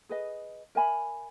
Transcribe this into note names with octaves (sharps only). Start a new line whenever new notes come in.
G#4 B4 D#5
A#4 E5 G#5 B5